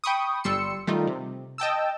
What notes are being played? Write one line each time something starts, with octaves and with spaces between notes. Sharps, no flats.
G5 B5 C#6 D#6
G1 G3 C6 E6 C#7
D#3 G3 A3 D#4 F4
C3
D#5 G5 A5 E6